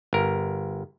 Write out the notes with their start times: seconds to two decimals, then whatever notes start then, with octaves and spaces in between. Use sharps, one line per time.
0.13 G1 A#4